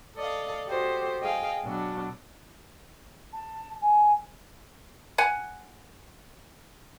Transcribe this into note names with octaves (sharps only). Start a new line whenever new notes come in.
A4 D5 D#5 F5
F#4 G4 A4 C5 D#5
G#4 D#5 F5 G5
B2 F#3 D4
A5
G#5
F#5 G#5